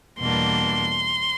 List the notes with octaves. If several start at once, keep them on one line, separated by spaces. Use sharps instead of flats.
E2 B2 G3 A#3 D4 C6